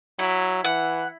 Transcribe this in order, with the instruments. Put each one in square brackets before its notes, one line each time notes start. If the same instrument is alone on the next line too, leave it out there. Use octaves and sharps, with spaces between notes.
[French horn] F#3 [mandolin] E4
[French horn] E3 [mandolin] F#5